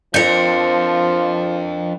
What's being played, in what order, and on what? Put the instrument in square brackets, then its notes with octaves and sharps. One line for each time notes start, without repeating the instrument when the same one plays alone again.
[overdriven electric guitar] F2 [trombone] F3 [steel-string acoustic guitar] D4 A#4 [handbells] G6 C#7